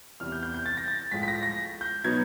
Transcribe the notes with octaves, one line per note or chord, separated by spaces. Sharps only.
E2 C3 E3 G3 F6
G6
G6
G6
A6
A#6
A6
A2 F3 G#3 B6
B6
A#6
A#6
G6
B2 F#3 B3 D#4 G#6